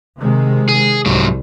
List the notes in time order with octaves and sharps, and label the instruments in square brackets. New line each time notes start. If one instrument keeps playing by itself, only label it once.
[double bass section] C3 D#3 G#3
[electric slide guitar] G#4
[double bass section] C2 [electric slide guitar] G#2 F#3